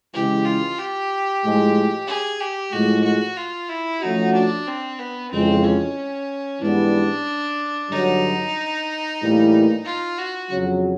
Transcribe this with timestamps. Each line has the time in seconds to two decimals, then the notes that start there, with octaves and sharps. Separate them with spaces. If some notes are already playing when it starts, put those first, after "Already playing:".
0.13 C#3 E3 G#3 G4
0.45 F4
0.78 G4
1.42 A2 F3 G#3
2.07 G#4
2.40 G4
2.72 A2 F3 G#3 F#4
3.04 F#4
3.37 F4
3.69 E4
4.01 F3 A3 C#4 D#4 F#4
4.34 D4
4.67 C4
4.98 B3
5.31 F2 C#3 E3 G#3 C4
5.64 C#4
6.61 G#2 E3 G3 B3 D4
7.90 G2 D3 F#3 D#4
9.20 A2 E3 G3 A#3
9.85 F4
10.17 F#4
10.51 F2 C#3 F#3